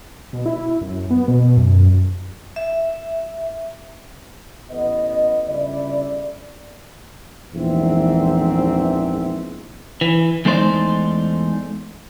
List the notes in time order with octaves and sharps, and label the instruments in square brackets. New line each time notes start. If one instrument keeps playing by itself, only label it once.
[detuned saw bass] B2
E4
F#2
B3
B2
F#2
[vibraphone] E5
[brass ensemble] A1 B3 D#5
G1 C#3 E4 D5
A#1 E2 G#2 E3 C4 E5
[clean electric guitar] E3
E2 G#3 A3 D#4 C5 D5